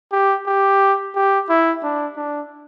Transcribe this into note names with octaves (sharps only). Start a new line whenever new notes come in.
G4
G4
G4
E4
D4
D4